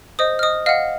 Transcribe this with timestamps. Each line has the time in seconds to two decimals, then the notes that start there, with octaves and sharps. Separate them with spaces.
0.19 C5 D#5 D#6
0.39 F6
0.43 D#5 D#6
0.66 D#5 F5 F#5 F6